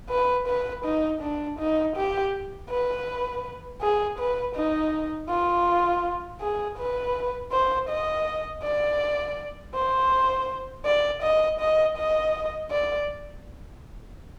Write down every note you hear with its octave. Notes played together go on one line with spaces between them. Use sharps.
B4
B4
D#4
D4
D#4
G4
B4
G#4
B4
D#4
F4
G#4
B4
C5
D#5
D5
C5
D5
D#5
D#5
D#5
D5